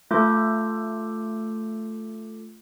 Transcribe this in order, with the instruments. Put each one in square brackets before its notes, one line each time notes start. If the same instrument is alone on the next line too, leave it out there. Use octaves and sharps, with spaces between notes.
[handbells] A3 F4 A4 D6 G6